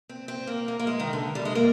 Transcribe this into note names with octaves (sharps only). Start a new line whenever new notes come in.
C4
C4
A#3
A#3
A#3
G#3
D#3
D3
G3
G#3
A#3